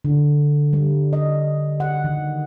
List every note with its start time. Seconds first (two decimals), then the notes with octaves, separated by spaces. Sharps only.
0.05 D3
0.73 G3
1.13 D#5
1.80 F#5
2.04 D#3